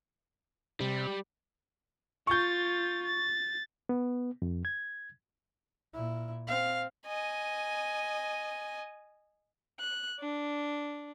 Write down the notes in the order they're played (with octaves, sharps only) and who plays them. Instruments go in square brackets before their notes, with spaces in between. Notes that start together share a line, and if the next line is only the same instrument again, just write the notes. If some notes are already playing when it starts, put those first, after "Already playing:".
[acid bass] C3 [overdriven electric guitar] G3
[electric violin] F4 A6 [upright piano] C#6 G6
[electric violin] A6
[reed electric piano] B3
F2
G#6
[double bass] A#2 E4
[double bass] C4 [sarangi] F5
[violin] D#5 G#5
[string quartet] F#6
D4